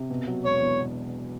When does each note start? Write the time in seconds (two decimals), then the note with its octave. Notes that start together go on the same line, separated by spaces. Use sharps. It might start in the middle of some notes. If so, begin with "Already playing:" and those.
Already playing: C3
0.10 B2
0.27 F#3
0.45 E1 C#5
0.62 E2
0.79 B2